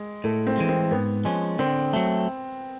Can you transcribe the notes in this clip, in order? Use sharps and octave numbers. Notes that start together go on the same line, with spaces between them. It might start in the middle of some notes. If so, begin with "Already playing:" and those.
Already playing: G#3
A2 A3
C4
E3 G#3
C4
G#2 B3
F3 G#3 C#4
D3 C4
F#3 A3